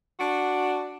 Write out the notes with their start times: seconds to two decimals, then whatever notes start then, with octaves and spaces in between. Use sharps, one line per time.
0.20 D4 F#4